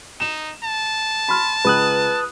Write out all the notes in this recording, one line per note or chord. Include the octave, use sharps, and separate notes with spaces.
D#4 E7
A5
B5 C6 F6
C#2 B4 D#6 F#6